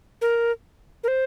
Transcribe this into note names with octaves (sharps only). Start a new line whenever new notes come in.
A#4
A#4
C5